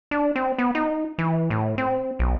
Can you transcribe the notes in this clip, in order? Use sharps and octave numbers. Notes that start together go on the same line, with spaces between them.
D4
C4
B3
D#4
E3
A2
C4
B1